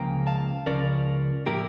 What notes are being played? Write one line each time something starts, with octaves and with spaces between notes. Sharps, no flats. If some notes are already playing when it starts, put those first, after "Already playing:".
Already playing: C#2 C#3 F3 A#3 G5 A#5
F5 A5
C#2 C#3 F3 C#4 A#4 D5
A2 F3 A#3 E4 G4 A#4